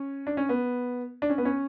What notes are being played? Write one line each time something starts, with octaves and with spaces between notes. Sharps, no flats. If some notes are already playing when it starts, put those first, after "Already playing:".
Already playing: C#4
D4
C#4
B3
D4
C#4
B3
C#4